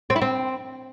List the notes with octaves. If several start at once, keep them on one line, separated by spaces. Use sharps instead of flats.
C4
E4
C4